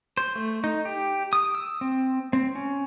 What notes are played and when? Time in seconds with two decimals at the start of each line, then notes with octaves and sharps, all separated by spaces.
0.17 C5
0.35 A3
0.64 D#4
0.85 G4
1.33 D#6
1.55 E6
1.81 C4
2.33 C4
2.55 C#4